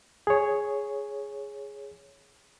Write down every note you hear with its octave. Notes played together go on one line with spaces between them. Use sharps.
G#4 C#5